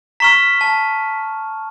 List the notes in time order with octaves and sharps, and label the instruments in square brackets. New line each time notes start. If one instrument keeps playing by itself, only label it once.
[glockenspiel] A#5 C#6 F6 [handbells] B6
[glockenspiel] A5